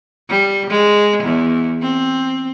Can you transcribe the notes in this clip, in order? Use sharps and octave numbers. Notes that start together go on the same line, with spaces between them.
G3
G#3
E2
C4